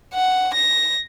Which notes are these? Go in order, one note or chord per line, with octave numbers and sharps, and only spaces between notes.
F#5
A#6